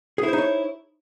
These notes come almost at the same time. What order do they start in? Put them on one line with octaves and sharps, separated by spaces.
G#4 E4 C5 D#4 C#5